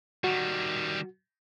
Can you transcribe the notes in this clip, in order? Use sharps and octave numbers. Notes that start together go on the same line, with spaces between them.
D#3 G3 F#4